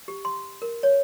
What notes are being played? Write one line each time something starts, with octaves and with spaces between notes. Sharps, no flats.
G4
C6
A#4
C#5